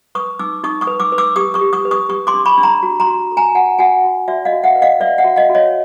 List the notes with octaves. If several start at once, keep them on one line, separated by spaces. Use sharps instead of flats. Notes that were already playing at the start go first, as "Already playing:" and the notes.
B4 C#6 D#6
D#4 D6 E6
D#4 C#6 D#6
C#6 D#6
B4
D6 E6
B4
D6 E6
G4 C#6 D#6
C#6 D#6
G4
C#6 D#6
B4
C#6 D#6
G4 C#6 D#6
C6 D6
D4
B5 C#6
D4
A#5 C6
F#4
A#5 C6
F#4
A4
G#5 A#5
F#4 F#5 G#5
F#4 F#5 G#5
F#4
F#4 D5 E5
D#5 F5
F#4
E5 F#5
B4
D#5 F5
B4 D5 E5
E5 F#5
F#4
D#5 F5
F#4
C#5 D#5